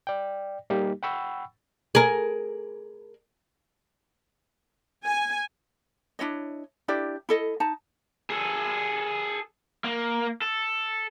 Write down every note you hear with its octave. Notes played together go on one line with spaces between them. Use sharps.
D5 G5
G3 A#3 D#4 G4
F#5 G5 B5 C#6 E6
G#4 A#4
G#5
D4 E4 C#5 D#5
D4 E4 G4 D5
E4 A4 D#5
D#4 A5
G#4 A4
A#3
A4